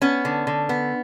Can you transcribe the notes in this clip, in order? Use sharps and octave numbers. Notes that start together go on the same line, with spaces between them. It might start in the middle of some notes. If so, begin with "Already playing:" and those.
B3 C#4
D3
D3
B3